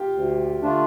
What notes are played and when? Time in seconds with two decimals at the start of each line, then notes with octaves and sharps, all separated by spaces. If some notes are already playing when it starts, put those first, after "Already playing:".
Already playing: F4 G4
0.15 D2
0.61 D3 A3 D4 F4